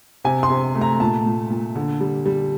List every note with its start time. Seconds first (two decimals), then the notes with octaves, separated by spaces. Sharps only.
0.24 C3 G#5
0.43 C6
0.50 C3
0.75 A3
0.81 A#5
1.00 A#2 A5
1.26 A#2
1.50 A#2
1.76 D3
2.00 G3
2.26 G3